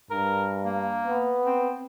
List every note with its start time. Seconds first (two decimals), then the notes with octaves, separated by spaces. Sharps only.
0.11 G2 A#4
0.65 A#3
1.05 B3
1.46 C4